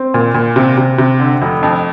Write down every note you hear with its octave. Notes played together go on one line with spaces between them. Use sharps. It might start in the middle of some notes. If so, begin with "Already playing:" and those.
Already playing: C4
A#2
A#2
C3
C3
C3
D3
F1
F2